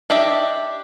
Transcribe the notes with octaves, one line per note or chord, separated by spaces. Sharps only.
D4 G4 D#5 E5